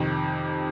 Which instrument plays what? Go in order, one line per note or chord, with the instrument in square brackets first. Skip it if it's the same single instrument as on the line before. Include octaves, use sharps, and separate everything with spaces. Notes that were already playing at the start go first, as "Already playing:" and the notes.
Already playing: [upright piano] F2 C3 D#3